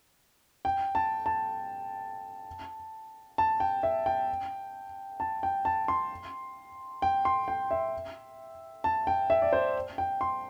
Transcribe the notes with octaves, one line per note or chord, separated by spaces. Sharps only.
G5
A5
A5
A5
G5
E5
G5
A5
G5
A5
C6
G5
C6
G5
E5
A5
G5
E5
D5
C5
G5
C6